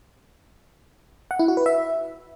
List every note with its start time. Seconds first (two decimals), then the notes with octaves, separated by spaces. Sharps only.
1.31 F#5
1.39 E4
1.48 F#4
1.57 B4
1.66 E5